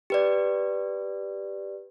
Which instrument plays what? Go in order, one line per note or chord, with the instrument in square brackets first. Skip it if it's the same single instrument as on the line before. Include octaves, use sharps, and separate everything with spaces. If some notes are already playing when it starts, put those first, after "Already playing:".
[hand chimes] G4 B4 D5